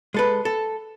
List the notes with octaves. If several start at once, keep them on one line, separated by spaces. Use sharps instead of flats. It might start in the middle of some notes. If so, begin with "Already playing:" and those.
G#3 A4 B4
A4